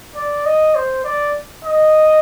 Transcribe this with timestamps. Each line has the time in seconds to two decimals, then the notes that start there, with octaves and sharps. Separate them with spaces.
0.15 D5
0.45 D#5
0.75 C5
1.04 D5
1.64 D#5